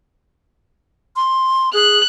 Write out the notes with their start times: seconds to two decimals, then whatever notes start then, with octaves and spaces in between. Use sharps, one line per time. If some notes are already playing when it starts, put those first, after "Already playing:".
1.16 C6
1.74 G#4 F#6